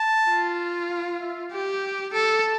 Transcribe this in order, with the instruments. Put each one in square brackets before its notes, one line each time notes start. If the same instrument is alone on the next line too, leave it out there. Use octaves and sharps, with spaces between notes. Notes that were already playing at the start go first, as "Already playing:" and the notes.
Already playing: [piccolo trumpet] A5
[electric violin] F4
[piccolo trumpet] F5
E5
[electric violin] G4 [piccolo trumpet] G5
[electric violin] A4 [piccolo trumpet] A5